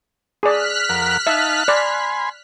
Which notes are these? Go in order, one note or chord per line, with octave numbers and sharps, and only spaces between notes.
G#4 D5 F6 F#6 B6
F2 A#4 F#5
D#4 E5 F5 A5
D5 G#5 B5 C6